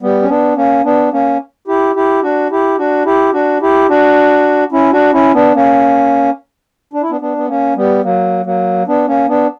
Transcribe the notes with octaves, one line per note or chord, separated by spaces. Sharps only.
G3 B3
C#4
B3 D4
A#3 C#4
B3 D4
A#3 C#4
E4 G4
E4 G4
D4 F#4
E4 G4
D4 F#4
E4 G4
D4 F#4
E4 G4
D4 F#4
C#4 E4
D4 F#4
C#4 E4
B3 D4
A#3 C#4
D4
E4
B3 D4
B3 D4
B3
A#3 C#4
G3 B3
F#3 A#3
F#3 A#3
B3 D4
A#3 C#4
B3 D4